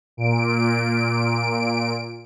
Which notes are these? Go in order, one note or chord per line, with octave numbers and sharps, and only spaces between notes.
A#2 D7